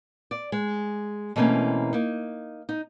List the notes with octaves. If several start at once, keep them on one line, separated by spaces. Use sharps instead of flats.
D5
G#3
B2 E3 A3 A#3 C4 C#4
A#3 D#4
D#4